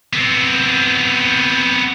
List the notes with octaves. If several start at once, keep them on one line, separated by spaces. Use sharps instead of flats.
B3 C4